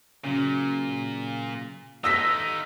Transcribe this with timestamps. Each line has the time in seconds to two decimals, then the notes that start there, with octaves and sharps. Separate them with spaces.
0.24 A#2 C#3 F#3
2.04 D#4 F4 G4 A4 D5 E6 A#6 B6